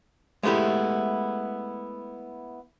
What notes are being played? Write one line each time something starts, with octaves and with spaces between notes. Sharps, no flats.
G#3 A3 B3 E4 G4